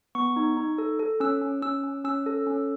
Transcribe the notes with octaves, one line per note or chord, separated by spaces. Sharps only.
B3 C#6
D#4
D#4
A4
A4
C#4 E6
C#4
C#4 E6
C#4
C#4 E6
A4
C#4